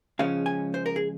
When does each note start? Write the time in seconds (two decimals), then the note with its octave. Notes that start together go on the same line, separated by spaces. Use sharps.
0.19 C#2 C#3 F3 G#3 C#4 F5
0.46 G#5
0.74 C5
0.86 A#4
0.96 G#4